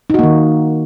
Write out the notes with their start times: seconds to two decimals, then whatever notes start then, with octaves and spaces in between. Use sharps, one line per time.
0.10 D#4
0.14 F#4
0.19 A#3
0.23 D#3